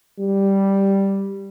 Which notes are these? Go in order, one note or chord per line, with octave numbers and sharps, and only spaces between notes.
G3